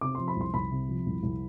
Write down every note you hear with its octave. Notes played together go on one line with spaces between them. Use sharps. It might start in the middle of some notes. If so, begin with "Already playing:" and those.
C3 D6
F3 C6
B5
C2 C6
C2 B5
C3
F3
C2
C2